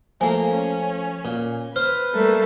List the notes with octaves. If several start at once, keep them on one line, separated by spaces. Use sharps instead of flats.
F3 A3 A#3 G#5
C#4
A#2
B4 C5 F6
G3 A3 A#3